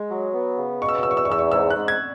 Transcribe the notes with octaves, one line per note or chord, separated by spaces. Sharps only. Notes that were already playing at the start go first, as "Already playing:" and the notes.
Already playing: G#3
F#3
B3
C#3
B2 C#6
E6
C#6
E2 E6
C#6
E6
C#6
E2 E6
C#6
G#2 E6
F#6
G#2
G#6